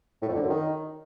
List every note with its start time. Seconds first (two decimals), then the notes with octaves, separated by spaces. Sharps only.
0.22 A2
0.29 F2
0.36 D3
0.43 F#2
0.50 D#3